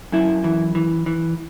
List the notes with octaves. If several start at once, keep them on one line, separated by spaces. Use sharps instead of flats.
F#2 E4
E3
E3
E3